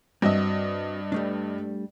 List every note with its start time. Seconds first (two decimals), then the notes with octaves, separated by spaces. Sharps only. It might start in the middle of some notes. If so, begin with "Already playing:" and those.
0.22 G2 C4 F#4 D#5 E5
1.12 G3 A3 D4